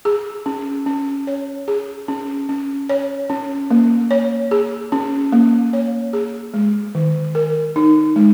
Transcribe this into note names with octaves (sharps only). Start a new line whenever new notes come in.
G#4
C#4
C#4
C#5
G#4
C#4
C#4
C#5
C#4
A#3
C#5
G#4
C#4
A#3
C#5
G#4
G#3
D#3
A#4
D#4
G#3